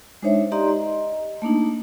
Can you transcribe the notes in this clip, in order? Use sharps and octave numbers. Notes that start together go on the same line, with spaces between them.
G#3 D4 D#4 C5 C#5 E5
D#4 G4 D5 D#5 A#5 C6
D#5
A3 A#3 D4 D#4